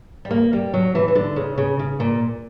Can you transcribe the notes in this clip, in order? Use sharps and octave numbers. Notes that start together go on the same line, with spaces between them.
G3
A#3
G3
F#3
E3
E3
D3
C#3
C#3
C#3
A#2